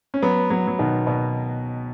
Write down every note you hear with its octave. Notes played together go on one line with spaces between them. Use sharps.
C#4
F#3 B3
F#3 B3
F#3
B2 D#3
B2